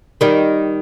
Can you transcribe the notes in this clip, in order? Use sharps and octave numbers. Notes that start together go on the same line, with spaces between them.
D#3 G3